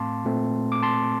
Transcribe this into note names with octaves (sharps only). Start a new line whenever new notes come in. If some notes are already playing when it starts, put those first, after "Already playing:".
Already playing: A2 A3 C4 F5 A5 C6 D6
A#2 A3 C4
D6
A5 C6